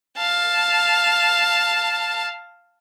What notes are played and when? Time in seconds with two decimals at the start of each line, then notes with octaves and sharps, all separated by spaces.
0.17 F5 A5